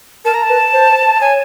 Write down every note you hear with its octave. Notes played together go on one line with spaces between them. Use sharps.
A#4 A5
A#5
A5
B4
C5
C#5 G#5